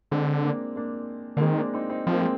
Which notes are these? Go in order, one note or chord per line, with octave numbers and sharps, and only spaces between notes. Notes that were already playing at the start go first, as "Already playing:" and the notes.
D3 G#3 C4
A#3 D4
A#3 D4
D3 A#3
D#3 G#3 C4
A#3 D4
C4 D#4
C4 D#4
F3 C4
A#3
G#3 C4